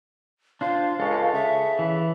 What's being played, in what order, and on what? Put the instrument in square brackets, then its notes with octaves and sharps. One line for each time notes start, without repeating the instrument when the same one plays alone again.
[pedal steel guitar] D4 F4 C5 [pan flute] F5
[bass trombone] C#2 [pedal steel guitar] A4 C#5
[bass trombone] C#3 [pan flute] E5
[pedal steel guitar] E3